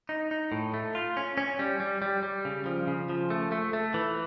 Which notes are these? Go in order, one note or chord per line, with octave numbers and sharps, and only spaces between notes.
D#4
D#4
A2
A3
F4
C#4
C#4
G3
G3
G3
G3
C#3
F3
C#3
F3
A3
A3
A3
E3